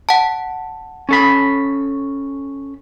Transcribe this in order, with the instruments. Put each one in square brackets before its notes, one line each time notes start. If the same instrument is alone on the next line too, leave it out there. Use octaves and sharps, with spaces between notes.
[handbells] F#5 A5
[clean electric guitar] C#4 A4 B5